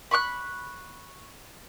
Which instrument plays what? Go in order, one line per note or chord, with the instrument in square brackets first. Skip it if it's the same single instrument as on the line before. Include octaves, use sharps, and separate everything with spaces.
[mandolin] B5 C#6 D6 F#6